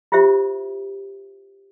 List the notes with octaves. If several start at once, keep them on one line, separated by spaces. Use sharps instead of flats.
E4 F4 G4 C5 E5